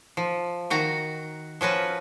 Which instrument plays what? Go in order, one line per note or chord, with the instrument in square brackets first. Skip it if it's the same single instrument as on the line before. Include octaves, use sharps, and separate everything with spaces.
[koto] F3
D#3 F#4 A#5
F3 C#4 F#4 B4